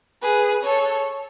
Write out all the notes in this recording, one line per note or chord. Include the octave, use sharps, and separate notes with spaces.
G#4 B4
A4 C#5